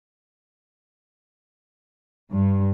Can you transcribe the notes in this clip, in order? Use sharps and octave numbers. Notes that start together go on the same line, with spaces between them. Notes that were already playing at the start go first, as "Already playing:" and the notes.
G2